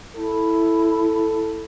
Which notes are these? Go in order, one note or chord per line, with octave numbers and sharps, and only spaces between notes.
E4 A4